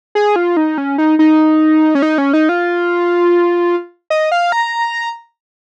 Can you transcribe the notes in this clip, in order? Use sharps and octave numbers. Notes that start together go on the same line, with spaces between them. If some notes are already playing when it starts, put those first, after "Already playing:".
G#4
F4
D#4
C#4
D#4
D#4
C#4
D#4
C#4
D#4
F4
D#5
F5
A#5